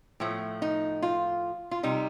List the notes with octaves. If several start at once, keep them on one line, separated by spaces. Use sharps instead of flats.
A2 F3 A3
D#4
F4
F4
C3 G3 D#4